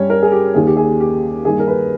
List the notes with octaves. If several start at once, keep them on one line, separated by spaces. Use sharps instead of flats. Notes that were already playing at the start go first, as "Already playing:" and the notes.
Already playing: G2 G3 C#4 C#5
A#4
G#4
G4
D#2 D#3 A#3 G#4
G4
G#4
G4
G2 D#3 A#3 D#4 G#4
A#4
B4